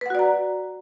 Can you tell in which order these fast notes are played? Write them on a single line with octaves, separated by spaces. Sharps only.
B4 F#5 F#4 D5 A#5